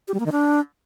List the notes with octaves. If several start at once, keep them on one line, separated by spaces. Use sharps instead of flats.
G4
G3
A#3
D#3
D4